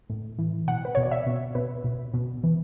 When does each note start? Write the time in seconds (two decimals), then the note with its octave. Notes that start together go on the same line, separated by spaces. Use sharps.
0.10 A2
0.39 E3
0.68 B2 F#5
0.85 B4
0.95 B2 C#5
1.03 D5
1.11 E5
1.26 B2
1.55 B2 B4
1.84 B2
2.14 B2
2.43 E3